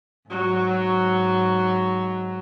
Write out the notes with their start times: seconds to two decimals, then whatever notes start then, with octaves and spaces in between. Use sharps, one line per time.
0.29 G#2 F#3